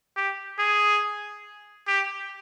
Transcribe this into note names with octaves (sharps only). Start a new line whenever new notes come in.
G4
G#4
G4